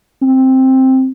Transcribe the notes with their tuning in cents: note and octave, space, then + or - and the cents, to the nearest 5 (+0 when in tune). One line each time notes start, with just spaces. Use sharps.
C4 +5